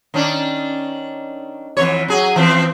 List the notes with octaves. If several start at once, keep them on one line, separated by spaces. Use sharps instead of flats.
D#3 C#4 D4
F2 E3 C#5
F#3 G#4
E3 F3 C4